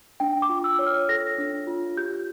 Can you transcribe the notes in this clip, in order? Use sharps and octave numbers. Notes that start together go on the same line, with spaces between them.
D4 G5
D6
F4
E6
C#5
F6
A4 A#6
D4
F4
G4 G6